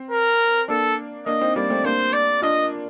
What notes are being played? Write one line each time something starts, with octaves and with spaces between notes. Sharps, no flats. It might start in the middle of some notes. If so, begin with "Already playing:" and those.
Already playing: C4
A#4
A#3 D4 A4
A#3 D4 D#5
C4 D#4
G3 A#3 D5
A3 C4
A#3 D4 C5
D5
D4 F4 D#5